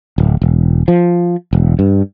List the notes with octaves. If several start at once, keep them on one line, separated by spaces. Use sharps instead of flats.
D1
E1
F3
E1
G2